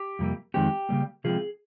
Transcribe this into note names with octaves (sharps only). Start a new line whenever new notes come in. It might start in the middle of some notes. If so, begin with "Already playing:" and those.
Already playing: G4
F2 C3 G3 A#3
F2 D#3 G#3 C4 G4
C#3 G3 A#3
C3 F3 G#3 C4 G#4